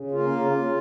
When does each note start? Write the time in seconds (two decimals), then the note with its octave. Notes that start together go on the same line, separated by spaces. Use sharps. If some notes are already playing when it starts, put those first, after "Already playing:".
Already playing: C#3
0.11 A#3 F4
0.31 C#3
0.52 C#3